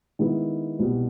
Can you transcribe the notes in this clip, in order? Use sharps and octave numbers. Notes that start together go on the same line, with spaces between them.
D#3 G#3 B3 E4
C2 B2 G3